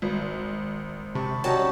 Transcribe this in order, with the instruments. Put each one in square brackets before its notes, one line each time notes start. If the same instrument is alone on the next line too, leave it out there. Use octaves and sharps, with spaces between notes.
[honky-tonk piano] G#1
[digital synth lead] C3 [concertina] A5 B5 C#6
[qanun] F#3 G3 C#4 [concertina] D#4 F#4 [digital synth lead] A5